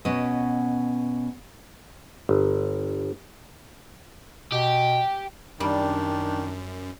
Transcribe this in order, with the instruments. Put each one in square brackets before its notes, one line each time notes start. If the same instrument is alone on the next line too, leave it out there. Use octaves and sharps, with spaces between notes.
[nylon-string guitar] B2 B3 C#4 D#5
[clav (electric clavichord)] G1
[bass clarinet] B2 [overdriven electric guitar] G4
[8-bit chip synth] F#2 [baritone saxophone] D#3 [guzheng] G3 [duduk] D4